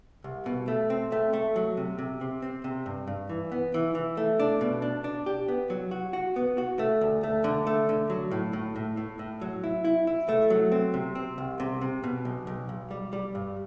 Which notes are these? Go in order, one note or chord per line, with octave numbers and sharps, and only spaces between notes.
C2
B2
A3
C4
A3
A3
F#3
C3
C3
C3
C4
C3
G2
G2
E3
B3
E3
E3
A3
D4
B2
D4
D4
G4
B3
F#3
F#4
F#4
B3
F#4
A3
D2
A3
D3
A3
D3
F#3
A2
A2
A2
A2
A2
F#3
E4
E4
E4
A3
F#3
C4
C3
C4
C2
C3
C3
B2
B1
B1
B1
G3
G3
G2